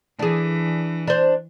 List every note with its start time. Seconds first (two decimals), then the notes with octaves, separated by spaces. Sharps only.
0.19 E3 D4 G#4
1.07 D4 C5